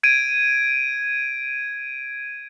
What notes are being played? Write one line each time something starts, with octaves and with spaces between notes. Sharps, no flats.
G#6 D7 D#7